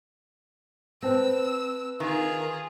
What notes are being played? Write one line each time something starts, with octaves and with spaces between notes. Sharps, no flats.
C4 B4 A5 E6 A#6
D#3 F4 G#4